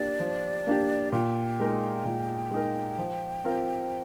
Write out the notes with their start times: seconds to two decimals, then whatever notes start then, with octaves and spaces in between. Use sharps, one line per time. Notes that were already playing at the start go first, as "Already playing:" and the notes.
Already playing: A#3 D4 G4 D5
0.20 F3
0.67 A#3 D4 G4
1.12 A#2 G5
1.60 G#3 D#4 A#4
2.05 A#2
2.51 G#3 D#4 A#4
2.98 F3
3.44 C4 F4 A#4